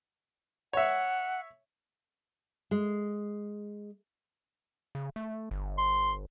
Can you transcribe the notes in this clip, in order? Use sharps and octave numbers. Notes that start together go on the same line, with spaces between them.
C#5 E5 F#5
G#3
C#3
A3
G1
C6